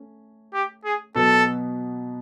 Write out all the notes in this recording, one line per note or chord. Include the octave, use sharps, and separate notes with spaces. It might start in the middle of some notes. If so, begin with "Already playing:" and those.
Already playing: A3 C#4
G4
G#4
B2 F#3 B3 A4